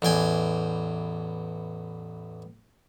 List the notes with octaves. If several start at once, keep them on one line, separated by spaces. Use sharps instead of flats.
A1 E2 G5 G#5